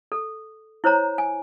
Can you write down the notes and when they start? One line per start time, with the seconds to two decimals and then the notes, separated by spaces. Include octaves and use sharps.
0.12 A4
0.84 E4 C5 C#5 A#5
1.18 G#5